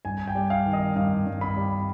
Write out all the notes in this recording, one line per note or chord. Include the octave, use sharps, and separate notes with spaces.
G2 G#5
G5
G3
F5
D#3
D#5
G2 F5
G2
B5
G3